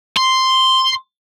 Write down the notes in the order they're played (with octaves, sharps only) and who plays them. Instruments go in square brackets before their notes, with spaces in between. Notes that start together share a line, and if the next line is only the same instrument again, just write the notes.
[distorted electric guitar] C6